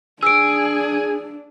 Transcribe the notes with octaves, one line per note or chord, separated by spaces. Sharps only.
D4 G#4 E6 D7